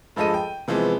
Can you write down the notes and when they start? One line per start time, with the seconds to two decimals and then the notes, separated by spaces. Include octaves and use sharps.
0.16 G2 F3 G#3 A4 D#5 D#7
0.34 G5
0.68 C3 E3 F3 G#3 B3